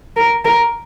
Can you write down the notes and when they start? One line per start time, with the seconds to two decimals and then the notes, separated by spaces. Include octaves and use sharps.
0.16 A#4
0.45 A#4